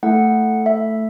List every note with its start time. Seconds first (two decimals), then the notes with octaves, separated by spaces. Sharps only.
0.03 A3 E4 A4 F#5
0.66 E5